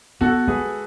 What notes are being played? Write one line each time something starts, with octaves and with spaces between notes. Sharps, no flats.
B3 F#4 A4
G#3 G#4 B4